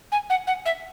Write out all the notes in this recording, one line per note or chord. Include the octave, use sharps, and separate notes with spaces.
G#5
F#5
F#5
E5